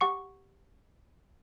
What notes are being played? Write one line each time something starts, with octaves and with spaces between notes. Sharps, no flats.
G4 F#5 C#6 C#7